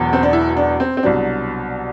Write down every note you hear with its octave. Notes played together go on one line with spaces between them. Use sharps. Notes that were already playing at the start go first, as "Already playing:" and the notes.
Already playing: E1 E2 B2 F#3
C4
D4
E4
D4
C4
C4
C2 B2 F#3 D4